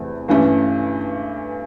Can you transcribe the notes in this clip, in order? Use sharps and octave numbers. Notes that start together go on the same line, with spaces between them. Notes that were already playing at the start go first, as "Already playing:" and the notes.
Already playing: E2 C3 E3 A3
G2 E3 A3 C#4